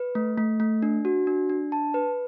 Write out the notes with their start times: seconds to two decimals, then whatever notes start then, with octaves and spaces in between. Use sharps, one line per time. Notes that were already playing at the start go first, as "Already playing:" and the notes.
Already playing: B4
0.15 A3
0.38 A3
0.60 A3
0.83 D4
1.05 F#4
1.27 D4
1.50 D4
1.72 A5
1.94 B4